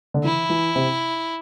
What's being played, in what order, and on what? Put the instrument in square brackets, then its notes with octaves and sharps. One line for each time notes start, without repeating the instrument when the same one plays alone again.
[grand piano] D3
[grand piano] E3 [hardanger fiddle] E4
[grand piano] E3
C3